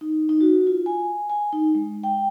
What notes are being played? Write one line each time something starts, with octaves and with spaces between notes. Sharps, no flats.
D#4
D#4
F#4
F4
G#5
G#5
D#4
G#3
G5